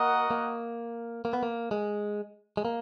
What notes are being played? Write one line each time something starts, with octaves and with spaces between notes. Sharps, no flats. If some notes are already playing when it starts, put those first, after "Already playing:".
Already playing: A#3 F#4 A#4 D#5 F#5
A#3
A#3
B3
A#3
G#3
G#3
A#3